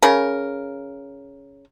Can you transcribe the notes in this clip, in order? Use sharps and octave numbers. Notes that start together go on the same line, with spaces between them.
C#3 A#4